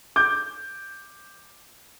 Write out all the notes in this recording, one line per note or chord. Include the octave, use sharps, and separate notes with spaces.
D6 G6